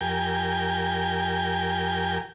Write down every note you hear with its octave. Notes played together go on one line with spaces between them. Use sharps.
F2 G4 A#4 G5 G#5